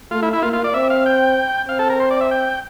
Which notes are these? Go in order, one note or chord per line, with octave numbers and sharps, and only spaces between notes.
A3 F4
E4
E4
A#3 F4
F4
D5
C4 E5
F5
G5
C4 F5
A4
A#4
C5
D5
E5
G5